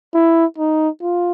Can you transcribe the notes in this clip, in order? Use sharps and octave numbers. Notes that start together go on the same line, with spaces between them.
E4
D#4
F4